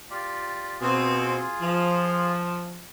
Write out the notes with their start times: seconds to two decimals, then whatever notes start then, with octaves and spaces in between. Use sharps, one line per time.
0.10 F4 G4 D5
0.80 B2 C4 F4 G#4
1.61 F3